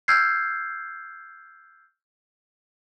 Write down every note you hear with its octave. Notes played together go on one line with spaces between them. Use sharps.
E6 F6 G6 G#6 C7